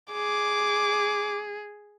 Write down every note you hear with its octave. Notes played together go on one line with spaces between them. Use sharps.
G#4 D6